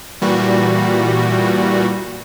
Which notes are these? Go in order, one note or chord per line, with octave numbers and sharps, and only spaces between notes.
A#2 E3 G3 F#4